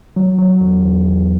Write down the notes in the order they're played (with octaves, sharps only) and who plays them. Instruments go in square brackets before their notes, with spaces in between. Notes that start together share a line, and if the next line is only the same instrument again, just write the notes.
[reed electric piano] F#3
F#3
E2
E2
E2